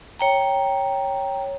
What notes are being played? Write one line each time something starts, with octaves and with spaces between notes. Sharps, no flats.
C#5 G5 A#5